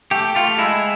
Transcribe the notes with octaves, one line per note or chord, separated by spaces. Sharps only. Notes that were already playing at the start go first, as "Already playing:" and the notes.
A3 G4
A3 F4
G#3 E4